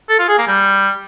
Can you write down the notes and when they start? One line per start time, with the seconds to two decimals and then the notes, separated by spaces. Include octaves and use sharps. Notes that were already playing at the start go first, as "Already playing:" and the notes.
0.09 A4
0.19 F4
0.28 G#4
0.38 A#3
0.47 G3